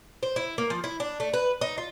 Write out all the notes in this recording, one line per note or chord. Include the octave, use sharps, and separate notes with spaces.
C5
E4
A#3
F3
E4
D4
A3
B4
D#4
F4